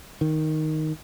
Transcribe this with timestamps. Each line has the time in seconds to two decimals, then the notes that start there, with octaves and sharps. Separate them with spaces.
0.21 D#3